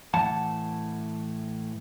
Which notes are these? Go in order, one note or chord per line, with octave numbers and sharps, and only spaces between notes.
A2 E3 F#5 A5